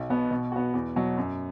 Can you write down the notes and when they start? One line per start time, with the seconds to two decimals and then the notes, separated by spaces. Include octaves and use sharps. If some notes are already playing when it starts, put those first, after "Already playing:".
Already playing: B1
0.10 B2 B3
0.31 B2
0.52 B3 F#4
0.74 E2
0.96 B2 F#3
1.17 F#2